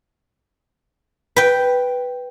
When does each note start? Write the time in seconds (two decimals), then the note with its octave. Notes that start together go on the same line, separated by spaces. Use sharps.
1.36 B4 G5